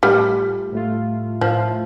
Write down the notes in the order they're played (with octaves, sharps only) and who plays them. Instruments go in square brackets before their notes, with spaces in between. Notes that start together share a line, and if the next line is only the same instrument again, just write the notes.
[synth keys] A2 A3 F4 [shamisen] G3
[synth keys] A2 A3 F4
[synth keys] A2 A3 F4 [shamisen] F3